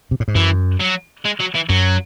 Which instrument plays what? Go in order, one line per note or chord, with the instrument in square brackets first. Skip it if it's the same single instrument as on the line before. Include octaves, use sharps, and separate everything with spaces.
[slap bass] C3
A2
G#2
[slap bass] F#2 [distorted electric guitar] E3
[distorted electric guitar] F#3
G#3
F#3
E3
[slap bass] F#2 [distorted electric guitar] F#3